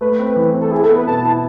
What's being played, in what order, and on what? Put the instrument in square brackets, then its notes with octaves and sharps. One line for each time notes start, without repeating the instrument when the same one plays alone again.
[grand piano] A3 [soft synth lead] B4
[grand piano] C4
E3
C4
[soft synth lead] A4
[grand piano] E4 [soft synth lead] G#4
[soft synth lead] A4
[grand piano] B3
[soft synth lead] B4
[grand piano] B2 [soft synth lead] A5
[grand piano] E4